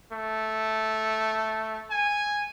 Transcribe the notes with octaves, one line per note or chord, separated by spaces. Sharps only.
A3
G#5